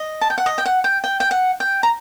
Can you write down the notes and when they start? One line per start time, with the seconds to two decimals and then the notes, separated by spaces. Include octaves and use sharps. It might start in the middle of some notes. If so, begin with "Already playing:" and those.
Already playing: D#5
0.21 A5
0.30 G5
0.38 F#5
0.46 D#5
0.58 G5
0.66 F#5
0.84 G5
1.04 G5
1.20 G5
1.31 F#5
1.60 G5
1.83 A#5